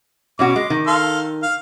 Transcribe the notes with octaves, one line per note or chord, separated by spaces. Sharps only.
B2 C#4 F#4 D6
G#3
D#3
A4 F5 C6
F5